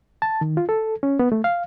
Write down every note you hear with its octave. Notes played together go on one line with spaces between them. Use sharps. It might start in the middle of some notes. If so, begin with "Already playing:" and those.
A5
D#3
F4
A4
C#4
B3
A3
F5